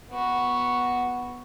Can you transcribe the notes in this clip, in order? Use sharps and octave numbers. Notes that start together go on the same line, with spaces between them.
B3 F#4